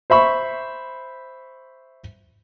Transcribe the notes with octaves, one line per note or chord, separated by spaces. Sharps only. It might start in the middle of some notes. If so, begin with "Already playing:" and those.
C5 E5 B5 C#6